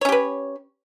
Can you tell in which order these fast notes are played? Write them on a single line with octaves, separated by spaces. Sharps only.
C#5 C#4 G4 B4